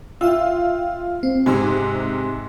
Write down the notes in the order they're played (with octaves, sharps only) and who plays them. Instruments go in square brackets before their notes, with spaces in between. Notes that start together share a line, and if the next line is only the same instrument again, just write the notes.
[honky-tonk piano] F4 [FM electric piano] E5 G5 E6
[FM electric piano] C4
[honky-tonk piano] G#2 C3 [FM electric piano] G#5 C6 E6